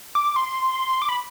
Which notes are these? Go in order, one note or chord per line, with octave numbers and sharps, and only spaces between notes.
D6
C6
D6
B5